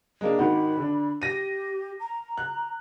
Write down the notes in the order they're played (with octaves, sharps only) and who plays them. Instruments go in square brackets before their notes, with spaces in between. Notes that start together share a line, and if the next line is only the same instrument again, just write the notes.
[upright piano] G#3 A#3 D4
[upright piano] G#1 D#3 F#4 [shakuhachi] B5
[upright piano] D3 D4
[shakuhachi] G4 [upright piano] A#6 D#7
[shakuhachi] A#5
[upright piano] F#6